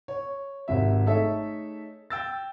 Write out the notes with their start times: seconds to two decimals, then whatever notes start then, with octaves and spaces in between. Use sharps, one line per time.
0.08 C#5
0.68 G#1 C3 E5
1.06 A3 D#4 G#4 A4 C#5 E5
2.10 G5 E6 A6